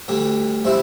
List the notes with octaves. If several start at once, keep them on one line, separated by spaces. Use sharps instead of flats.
D2 D3 G3 D4
C3 G3 C4 E4